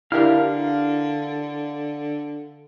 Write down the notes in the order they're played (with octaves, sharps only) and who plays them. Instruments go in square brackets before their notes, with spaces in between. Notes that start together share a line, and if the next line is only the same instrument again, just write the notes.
[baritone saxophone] D3 [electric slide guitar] D4 [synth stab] E4 G4 A#4 [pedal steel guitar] F5 F6